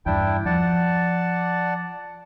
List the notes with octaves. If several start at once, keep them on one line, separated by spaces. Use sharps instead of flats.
E2 G2 D4 E4 G5
F3 D5 F#5 A5